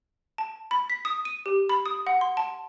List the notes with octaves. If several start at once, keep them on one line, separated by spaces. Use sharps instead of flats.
A5
B5
B6
D#6
D#7
G4
B5
D#6
F#5
C6
A5